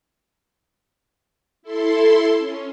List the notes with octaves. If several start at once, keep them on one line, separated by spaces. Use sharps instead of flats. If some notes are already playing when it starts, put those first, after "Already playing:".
E4 A4 C6
C#4